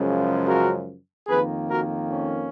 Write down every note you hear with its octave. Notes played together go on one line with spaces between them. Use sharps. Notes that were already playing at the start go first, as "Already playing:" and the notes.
Already playing: F#2 C#3 F3 G#3
F#4 A#4
F2 D#3 A#3 G#4 B4
F#4 A#4
C#4